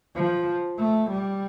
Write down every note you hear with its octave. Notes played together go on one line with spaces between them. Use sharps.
F3
A3
G3